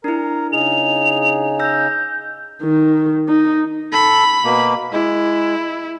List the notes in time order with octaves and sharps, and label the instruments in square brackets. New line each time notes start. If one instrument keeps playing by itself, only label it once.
[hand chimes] D4 E4 [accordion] A#4 A#5
[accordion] C#3 D#4 G#4 [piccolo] F7
[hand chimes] E6 A#6 [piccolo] G6
[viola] D#3
D#4
[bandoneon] A4 [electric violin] B5
[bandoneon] B2 A#3
[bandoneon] G#3 [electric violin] E4